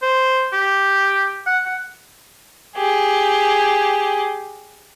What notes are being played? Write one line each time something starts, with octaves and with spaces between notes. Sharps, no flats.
C5
G4
F#5
F#5
G4 G#4